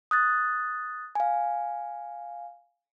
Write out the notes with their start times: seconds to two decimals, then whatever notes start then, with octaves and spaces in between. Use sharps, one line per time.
0.11 D#6 F#6 A6
1.15 F5 G#5